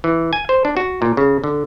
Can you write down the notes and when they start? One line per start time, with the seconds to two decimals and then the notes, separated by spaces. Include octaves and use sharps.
0.04 E3
0.33 G#5
0.49 C5
0.65 D4
0.77 F#4
1.02 A#2
1.17 C#3
1.44 D3